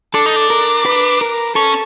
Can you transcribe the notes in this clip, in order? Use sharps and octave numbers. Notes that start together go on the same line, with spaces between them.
D4 A4
D#4
D4
A#4
B4
A#4
C#4 A4